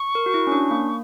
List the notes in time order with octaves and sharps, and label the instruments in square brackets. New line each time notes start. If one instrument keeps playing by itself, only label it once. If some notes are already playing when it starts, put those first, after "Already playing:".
Already playing: [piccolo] C#6
[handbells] A#4
F#4
E4
C#4
D4
A#3